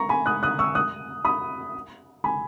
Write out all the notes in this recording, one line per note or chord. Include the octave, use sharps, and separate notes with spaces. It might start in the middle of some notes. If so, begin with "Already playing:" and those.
Already playing: A#5 C#6
G#5 B5
D#6 F#6
D#6 F#6
C#6 E6
D#6 F#6
B5 D#6
G#5 B5